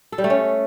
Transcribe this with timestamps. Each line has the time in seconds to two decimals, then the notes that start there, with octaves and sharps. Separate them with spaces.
0.12 A4
0.18 G3
0.24 A3
0.30 C#4